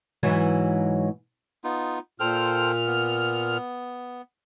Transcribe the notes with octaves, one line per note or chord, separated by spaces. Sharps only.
G#2 E3 F#3
B3 D#4 F4
A#2 A4 C5 G5 F6
B3